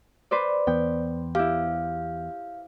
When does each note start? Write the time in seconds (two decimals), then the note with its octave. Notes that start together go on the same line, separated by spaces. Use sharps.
0.31 B4 C5 D5
0.67 E2 B3 G5
1.35 E4 G4 F5